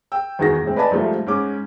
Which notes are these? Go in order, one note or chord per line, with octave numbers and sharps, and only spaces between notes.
G5 E6
E2 D#3 F#4 G#4 A#6
A2 G#3 C4
B4 D5 D#5 G#5 A5 B5
G#2 C3 F3 G3 A3
G#2 C#4 D6